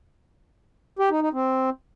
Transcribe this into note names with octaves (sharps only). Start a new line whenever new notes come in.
G4
D#4
D#4
C4